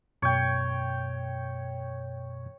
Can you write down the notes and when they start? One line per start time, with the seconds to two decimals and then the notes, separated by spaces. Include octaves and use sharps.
0.22 F#2 B2 C#5 G5